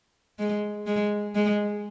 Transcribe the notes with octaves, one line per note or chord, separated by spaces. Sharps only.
G#3
G#3
G#3